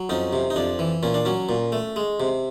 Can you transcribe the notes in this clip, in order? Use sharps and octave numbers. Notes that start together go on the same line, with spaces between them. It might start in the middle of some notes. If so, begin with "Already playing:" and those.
Already playing: F#3
F2 C#4 D#4
C3
D#4
F2 D4
E3
A#2 C#4
D4
F#3 C#4
A#2
A3
G#3
C3